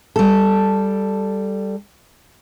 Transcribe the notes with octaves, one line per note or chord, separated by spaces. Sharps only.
G3 A4